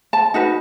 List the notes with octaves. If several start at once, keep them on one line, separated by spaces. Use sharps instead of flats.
A5
D#4 F#4 B4